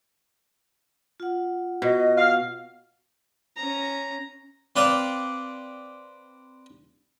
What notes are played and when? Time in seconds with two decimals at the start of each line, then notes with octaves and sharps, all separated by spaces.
1.20 F4 F#5
1.82 B2 D#5
2.18 F5
3.57 C#4 A#5
4.76 C4 B4 D5 F5